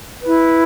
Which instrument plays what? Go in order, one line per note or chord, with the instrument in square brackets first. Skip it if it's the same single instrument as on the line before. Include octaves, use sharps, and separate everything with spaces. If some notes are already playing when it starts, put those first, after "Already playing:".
[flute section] E4 B4